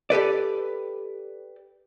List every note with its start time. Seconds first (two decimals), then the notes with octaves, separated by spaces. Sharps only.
0.10 G4 A4 B4 D5